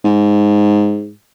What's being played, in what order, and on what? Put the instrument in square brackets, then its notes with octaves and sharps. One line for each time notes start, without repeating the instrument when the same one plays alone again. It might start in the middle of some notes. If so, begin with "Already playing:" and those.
[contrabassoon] G#2